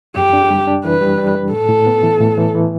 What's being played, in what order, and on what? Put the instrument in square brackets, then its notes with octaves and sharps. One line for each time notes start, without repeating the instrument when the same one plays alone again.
[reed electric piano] F#2 [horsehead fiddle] G4
[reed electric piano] D4
G3
D4
[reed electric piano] E3 [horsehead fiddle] B4
[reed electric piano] G3
G3
G3
[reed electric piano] A2 [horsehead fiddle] A4
[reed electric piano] A2
B3
E3
A2
E3
E3